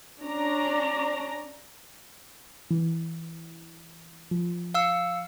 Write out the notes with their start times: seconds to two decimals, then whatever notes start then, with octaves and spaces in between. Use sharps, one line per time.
0.23 C#4 D4 A#5
2.71 E3
4.31 F3
4.74 F5 E6 C#7